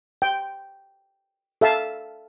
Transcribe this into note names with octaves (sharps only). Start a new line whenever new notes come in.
G5
A4 E5 F5 A5